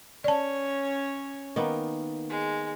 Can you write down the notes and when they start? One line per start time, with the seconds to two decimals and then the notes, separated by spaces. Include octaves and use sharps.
0.24 C#4 C#5 D5 A5
1.56 D#3 A#3 B3
2.30 G#3